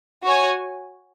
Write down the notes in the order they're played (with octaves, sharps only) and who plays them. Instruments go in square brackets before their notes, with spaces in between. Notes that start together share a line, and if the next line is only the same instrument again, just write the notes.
[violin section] F#4 C#5 G#5